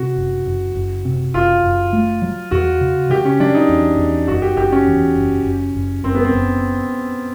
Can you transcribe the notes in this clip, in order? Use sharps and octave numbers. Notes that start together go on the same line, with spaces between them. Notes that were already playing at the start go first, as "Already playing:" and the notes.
Already playing: C3 F#4
F#1
F#1
F#1
C3
F#1 F4
F#1
A3
F#3
E2 F#4
C#3
C#3 G4
C#4
F#3 D4
D#4
E2
E2
F#1 F#4
G4
F#1 G4
C#4
E2
F#1
F#1
F#1
F#1 C4
B3
C4
F#1